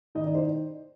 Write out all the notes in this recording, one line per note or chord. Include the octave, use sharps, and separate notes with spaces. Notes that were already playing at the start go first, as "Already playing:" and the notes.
D#3 D#5
D5
C5